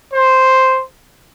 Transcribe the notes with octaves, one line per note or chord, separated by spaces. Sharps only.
C5